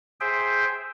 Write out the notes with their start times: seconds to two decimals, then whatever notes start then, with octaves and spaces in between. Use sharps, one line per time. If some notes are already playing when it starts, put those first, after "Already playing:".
0.21 G#4 C5 E5 G5